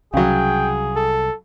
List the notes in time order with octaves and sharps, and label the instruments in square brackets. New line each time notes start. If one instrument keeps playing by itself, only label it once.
[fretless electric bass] C2 [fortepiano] C#3 F#3 [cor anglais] G#4 [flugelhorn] G5
[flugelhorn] A4